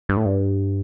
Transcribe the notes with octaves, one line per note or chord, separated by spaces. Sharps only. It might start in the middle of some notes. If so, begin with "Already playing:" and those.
G2
A2
G2